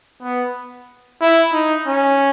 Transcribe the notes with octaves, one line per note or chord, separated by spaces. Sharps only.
B3
E4
D#4
C#4